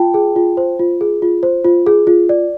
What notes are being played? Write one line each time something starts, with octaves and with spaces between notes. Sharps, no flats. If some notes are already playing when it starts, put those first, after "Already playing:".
Already playing: F4 G5 A5
G#4
F4
C5
F4
G#4
F4
C5
F4
G#4
F4
D5